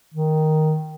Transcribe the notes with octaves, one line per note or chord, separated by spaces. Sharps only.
D#3